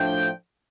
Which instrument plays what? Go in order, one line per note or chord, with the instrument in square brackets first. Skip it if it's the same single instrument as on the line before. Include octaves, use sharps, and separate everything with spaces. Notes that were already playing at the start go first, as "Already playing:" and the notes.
Already playing: [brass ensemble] A2 F3 A3 D4 G5